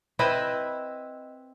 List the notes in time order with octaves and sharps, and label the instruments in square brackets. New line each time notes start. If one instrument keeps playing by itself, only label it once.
[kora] C4 E4 B4 D#5